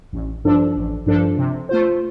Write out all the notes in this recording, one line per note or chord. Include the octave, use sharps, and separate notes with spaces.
A1
G2 F3 D4 A4
A1
G2 F3 D4 A4
C3
A3 F4 C5